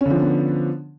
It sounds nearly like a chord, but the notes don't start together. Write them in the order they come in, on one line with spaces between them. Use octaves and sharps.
C#4 D3 F3 D4 B3